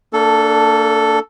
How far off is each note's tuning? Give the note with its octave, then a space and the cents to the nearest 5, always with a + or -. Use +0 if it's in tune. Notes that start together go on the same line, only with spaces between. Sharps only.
A#3 -35 D4 +0 A4 +0